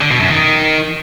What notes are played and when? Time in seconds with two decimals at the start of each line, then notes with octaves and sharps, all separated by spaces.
0.01 D3
0.11 B2
0.20 F#2
0.30 D#3